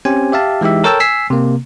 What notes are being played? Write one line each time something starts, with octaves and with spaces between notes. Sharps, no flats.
C4 C#4 G4 C5 G#5
G4 E5 F5 A5
E3 G#3 D#4 G4 E5
A4 A#4 C#5 G5 A5 E6
G#5 E6 B6 C7
C3 A#3